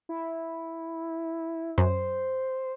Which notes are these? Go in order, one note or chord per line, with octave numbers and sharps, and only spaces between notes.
E4
F#2 C5